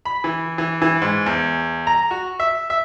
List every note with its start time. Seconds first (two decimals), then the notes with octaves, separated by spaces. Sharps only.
0.05 B5
0.24 E3
0.58 E3
0.82 E3
1.02 G#2
1.26 E2
1.87 A#5
2.11 F#4
2.40 E5
2.70 E5